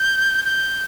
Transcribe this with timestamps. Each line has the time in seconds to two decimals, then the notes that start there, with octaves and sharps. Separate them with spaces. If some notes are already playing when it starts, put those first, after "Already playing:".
Already playing: G6
0.44 G6